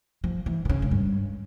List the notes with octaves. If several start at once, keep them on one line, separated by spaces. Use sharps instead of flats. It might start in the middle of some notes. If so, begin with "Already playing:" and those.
F3
E3
C3
C#3
G#2
G2